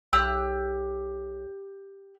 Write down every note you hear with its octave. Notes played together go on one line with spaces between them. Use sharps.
B1 G4 E6 F#6